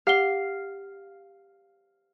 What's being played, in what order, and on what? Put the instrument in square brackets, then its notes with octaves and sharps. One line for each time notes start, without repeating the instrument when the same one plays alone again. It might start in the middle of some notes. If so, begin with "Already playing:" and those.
[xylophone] G4 F#5 G7 [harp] F5